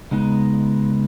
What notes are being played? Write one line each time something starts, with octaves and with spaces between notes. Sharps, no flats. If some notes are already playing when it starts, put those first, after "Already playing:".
C#3 G#3 B3 D#4